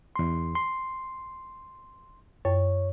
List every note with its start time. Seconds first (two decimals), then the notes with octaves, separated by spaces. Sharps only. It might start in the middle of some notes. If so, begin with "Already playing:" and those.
0.16 E2 C6
0.55 C6
2.45 F#2 C#5